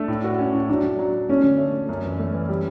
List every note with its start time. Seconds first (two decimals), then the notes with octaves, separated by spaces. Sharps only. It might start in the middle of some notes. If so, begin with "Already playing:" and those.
Already playing: A3 D4
0.08 A2
0.24 F#4
0.39 C#4
0.53 A2
0.69 F#3 D4
0.83 F#3
0.99 F#3
1.13 F#3
1.29 A3 C#4
1.44 D3
1.58 A3
1.73 A3
1.89 F#2
2.04 E3
2.19 A3
2.34 E3
2.49 G3